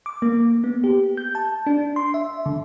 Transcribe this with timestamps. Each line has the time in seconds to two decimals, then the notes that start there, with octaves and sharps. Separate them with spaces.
0.06 D6
0.22 A#3
0.64 B3
0.84 G4
1.17 G6
1.35 A5
1.67 D4
1.96 C6
2.14 E5
2.46 D3